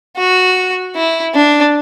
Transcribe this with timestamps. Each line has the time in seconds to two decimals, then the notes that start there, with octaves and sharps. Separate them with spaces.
0.17 F#4
0.95 E4
1.35 D4